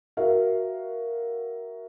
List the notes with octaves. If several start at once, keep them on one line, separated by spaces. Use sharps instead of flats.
F#4 A#4 E5 F5